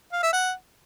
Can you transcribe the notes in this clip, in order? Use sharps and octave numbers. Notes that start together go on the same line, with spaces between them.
F5
E5
F#5